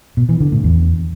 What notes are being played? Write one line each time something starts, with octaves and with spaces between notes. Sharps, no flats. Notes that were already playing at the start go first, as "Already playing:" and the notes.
B2
E3
D3
A2
E2